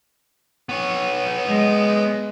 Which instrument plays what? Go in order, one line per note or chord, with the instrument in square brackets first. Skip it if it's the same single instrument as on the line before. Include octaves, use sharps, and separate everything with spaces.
[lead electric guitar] B3 C#5
[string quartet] G#3